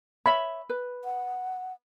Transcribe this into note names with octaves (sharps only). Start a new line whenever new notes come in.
C#5 E5 B5
B4
F#5